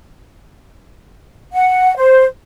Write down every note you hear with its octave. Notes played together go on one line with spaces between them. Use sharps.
F#5
C5